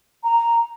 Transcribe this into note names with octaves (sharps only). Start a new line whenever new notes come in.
A#5